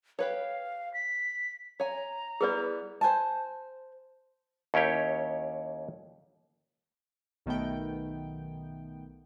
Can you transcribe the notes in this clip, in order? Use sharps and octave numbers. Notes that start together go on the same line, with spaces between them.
G4 B4 C#5 F5
B6
C#5 G#5 A#5
G3 B3 E4 G#4 B4 D5
C5 G#5 A5
D#2 C#4 E4 G4 C#5
B1 D#3 A3 B3 G5